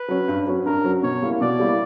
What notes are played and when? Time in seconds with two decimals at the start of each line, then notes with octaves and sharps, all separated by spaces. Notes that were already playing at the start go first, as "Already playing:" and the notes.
Already playing: B4
0.08 F#3 C#4
0.28 G2
0.47 F#3 C#4
0.66 G2 A#4
0.84 F#3 C#4
1.03 B2 C#5
1.22 G3 A#3 E4
1.41 B2 D5
1.59 G3 A#3 E4